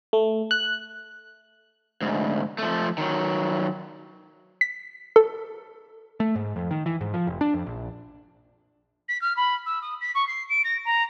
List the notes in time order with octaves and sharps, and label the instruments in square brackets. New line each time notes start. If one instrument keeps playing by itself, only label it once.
[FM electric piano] A3
F#6
[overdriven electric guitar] D2 G#2
F3 A3
D#3 F#3
[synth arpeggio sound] B6
A4
[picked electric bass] A3
G#2
F2
D#3
E3
G#2
F3
F1
D4
F2
A#1
[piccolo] B6
F6
B5
E6
D#6
B6
C#6
C7
D7
A#6
A#5